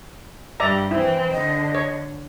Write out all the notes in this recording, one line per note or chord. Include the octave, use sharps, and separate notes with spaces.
G2 G3 D5 E5 A#5
E3 C4 E4
D3 D#5
C#5